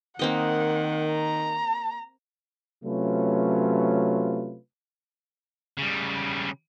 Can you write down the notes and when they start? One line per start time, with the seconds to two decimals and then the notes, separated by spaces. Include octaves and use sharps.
0.19 D#3 A#3 C4 D#5 F#5
1.12 A#5
2.84 C3 F#3 A3 C#4 F4 B4
5.77 C#3 G3